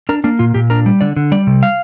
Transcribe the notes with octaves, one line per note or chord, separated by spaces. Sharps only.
D4 A#4
A#3 D4
A#2 F4
A#2 G4
D4 A#4
G3
D3 D5
D3
G3 D5
C3
F5